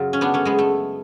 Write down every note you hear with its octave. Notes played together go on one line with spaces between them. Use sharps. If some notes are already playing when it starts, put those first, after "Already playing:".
Already playing: F#2 C#3 F#3 F4
C#4
B3 D4
A3 C#4
G#3 B3
A3